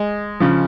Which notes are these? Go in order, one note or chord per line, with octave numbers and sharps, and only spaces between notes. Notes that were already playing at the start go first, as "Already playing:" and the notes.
Already playing: G#3
C#3 F3